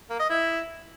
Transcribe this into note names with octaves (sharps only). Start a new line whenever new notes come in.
A#3
D#5
E4